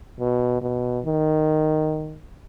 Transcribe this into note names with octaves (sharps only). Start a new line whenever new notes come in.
B2
B2
D#3